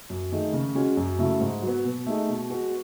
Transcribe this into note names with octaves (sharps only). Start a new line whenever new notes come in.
F#2
D#3 A3 D#4 G#4
C#3
G#3 C#4 F#4
F#2
C#3 F#3 A3 E4
G#2
F#3
B3
B2
A3 D#4 G#4
B2
G#3 B3 F#4